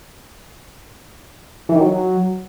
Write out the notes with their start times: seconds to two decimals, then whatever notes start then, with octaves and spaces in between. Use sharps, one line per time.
1.69 E3
1.75 D#3
1.81 F#3